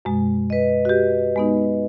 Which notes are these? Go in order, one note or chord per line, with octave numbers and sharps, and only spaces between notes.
F#2 B2 G#3
B4 D#5
F#4 G4
G#3 B3 D#4